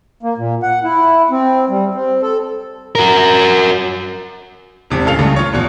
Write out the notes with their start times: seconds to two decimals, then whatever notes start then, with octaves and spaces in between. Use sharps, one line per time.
0.23 A#3
0.37 A#2
0.63 F#5
0.84 E4
1.30 C4
1.70 G3
1.95 C4
2.22 A4
2.95 F#4 A#4
4.90 E1 E2 C3
5.05 D1 C#3 A4 F5 F7
5.19 C#2 G2 C#3 A3
5.36 F4 C#5
5.52 A#1 E2 B2